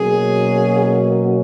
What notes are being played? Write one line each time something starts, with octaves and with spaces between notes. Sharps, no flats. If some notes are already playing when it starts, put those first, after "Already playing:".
Already playing: B2 F#3 A#3 C#4 G#4